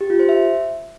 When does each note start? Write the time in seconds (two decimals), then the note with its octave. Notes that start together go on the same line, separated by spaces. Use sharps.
0.01 G4
0.10 F4
0.19 C5
0.29 E5